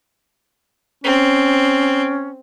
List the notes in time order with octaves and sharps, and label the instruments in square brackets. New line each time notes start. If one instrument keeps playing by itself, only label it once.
[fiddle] C4 [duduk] C#4